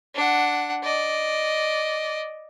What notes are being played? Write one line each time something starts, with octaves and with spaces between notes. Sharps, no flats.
D4 F#5
D5 D#5